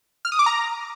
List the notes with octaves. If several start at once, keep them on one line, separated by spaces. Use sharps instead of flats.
F6
D#6
D6
A#5